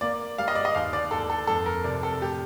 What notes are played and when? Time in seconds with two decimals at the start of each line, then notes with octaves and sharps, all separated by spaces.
0.01 A#3 D5
0.38 G3 F5
0.48 D#5
0.55 D5
0.65 D#5
0.75 D#2 F5
0.93 D5
1.11 D#2 A4
1.30 A4
1.48 F2 A4
1.66 A#4
1.84 C3 D5
2.03 A4
2.21 A2 G4